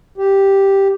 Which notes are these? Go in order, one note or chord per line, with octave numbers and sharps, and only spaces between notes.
G4